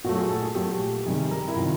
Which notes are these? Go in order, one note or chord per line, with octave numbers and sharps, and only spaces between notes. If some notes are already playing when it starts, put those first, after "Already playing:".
A#2 F#3 A3 F#4
G#4
A4
G#4
A#2 F#3 A3 G4
C3 D#3 G3 G#4
A#4
E4
C3 D#3 G3 F4